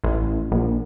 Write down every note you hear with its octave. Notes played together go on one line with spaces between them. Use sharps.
A1
A#1